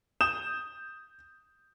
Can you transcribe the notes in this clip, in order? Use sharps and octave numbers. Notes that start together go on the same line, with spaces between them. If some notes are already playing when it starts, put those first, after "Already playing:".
D#6 G6 E7